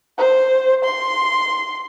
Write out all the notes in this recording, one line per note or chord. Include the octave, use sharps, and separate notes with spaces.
C5
C6